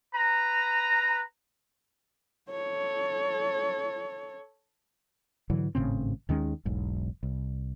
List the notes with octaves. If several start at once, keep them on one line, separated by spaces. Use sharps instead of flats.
B4 A#5
A4 C#5
G#2 D3 E3 F#3
G#1 A2 C#3 C4
D#2 D#3 G#3 C#4
E1 B1 G#2
C2